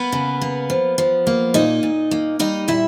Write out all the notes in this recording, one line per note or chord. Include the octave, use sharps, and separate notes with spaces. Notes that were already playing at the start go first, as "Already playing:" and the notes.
Already playing: A#3 B3 B4
C#3
A#3
F3
F3
A#3
A#2 D#4 D#5
A#2
A#3
G3 D#4 D#5
A#2 E4 E5